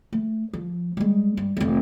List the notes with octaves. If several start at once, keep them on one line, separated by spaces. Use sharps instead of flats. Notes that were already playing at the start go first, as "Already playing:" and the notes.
A3
F3
G3 G#3
G2
F1 E2